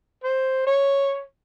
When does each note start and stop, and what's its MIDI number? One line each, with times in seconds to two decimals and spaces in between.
0.24 0.62 72
0.67 1.23 73